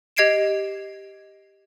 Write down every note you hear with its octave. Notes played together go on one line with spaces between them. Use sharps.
G4 D#5 G#6 C7 D7 E7